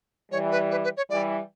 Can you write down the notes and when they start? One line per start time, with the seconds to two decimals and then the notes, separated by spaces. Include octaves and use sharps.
0.31 E3 G3 C#5
0.52 B4
0.71 B4
0.84 B4
0.97 C#5
1.09 E3 G3 D5